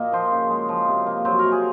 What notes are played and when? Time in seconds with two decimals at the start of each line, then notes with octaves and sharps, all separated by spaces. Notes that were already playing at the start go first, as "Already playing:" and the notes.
Already playing: A#2 A#3 D#5
0.12 F3 C5
0.32 C#3
0.50 G#3
0.69 F3
0.88 C3
1.06 A#3
1.25 F#3 C5
1.39 C3 A#4
1.52 G#4